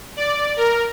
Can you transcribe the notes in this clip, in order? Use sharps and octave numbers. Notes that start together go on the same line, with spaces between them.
D5
A#4